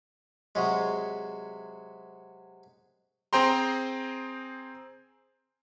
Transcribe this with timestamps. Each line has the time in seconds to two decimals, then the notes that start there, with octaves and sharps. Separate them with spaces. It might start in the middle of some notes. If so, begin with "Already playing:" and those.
0.55 C3 F#3 G#3
3.33 C4 G#4 C5 G5 A#5 C6